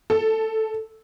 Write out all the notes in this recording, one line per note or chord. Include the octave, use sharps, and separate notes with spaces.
A4